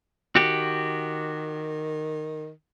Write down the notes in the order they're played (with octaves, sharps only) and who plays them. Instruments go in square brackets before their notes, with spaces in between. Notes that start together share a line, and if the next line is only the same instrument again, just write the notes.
[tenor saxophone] D#3 [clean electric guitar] F#4 G4